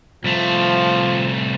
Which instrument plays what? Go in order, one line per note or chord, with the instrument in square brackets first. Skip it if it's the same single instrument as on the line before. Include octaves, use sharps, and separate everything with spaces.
[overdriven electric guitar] C2 A3 [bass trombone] F3